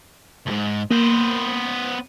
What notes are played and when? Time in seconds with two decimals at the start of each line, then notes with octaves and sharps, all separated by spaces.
0.46 D2 G#2
0.91 A#3 B3 C5